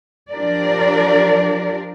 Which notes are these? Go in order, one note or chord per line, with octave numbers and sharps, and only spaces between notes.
F3 D4 G4 A#4 D5